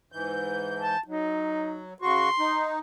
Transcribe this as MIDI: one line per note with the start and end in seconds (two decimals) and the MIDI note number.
0.12 0.96 44
0.12 0.96 52
0.12 0.96 91
0.78 1.00 81
1.07 1.94 54
1.07 1.83 63
2.02 2.30 49
2.02 2.30 66
2.02 2.74 84
2.02 2.30 85
2.39 2.79 63